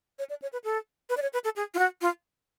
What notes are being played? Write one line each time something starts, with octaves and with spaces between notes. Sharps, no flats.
C#5
D5
C#5
B4
A4
B4
D5
C#5
B4
A4
G#4
F4
F#4
F4